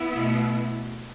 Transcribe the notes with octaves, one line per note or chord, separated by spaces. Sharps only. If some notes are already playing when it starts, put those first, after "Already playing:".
Already playing: B3 E4
B2 A3